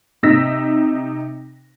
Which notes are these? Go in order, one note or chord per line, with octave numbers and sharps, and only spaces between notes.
C3 D#4 E6 A#6 B6